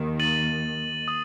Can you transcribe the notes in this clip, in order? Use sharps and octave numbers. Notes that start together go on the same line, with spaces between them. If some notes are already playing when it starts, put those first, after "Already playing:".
Already playing: D#2 D#3
A6 D#7 F#7
D#6